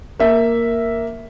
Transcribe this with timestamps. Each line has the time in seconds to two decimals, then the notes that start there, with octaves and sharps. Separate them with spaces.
0.20 A#3 E5